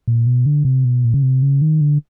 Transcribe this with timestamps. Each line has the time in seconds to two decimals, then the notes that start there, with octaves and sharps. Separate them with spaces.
0.08 A#2
0.27 B2
0.46 D3
0.65 C3
0.85 B2
1.04 A#2
1.14 C#3
1.23 C3
1.42 C#3
1.62 D#3
1.81 D3